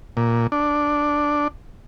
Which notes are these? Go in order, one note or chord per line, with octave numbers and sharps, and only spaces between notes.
A#2
D4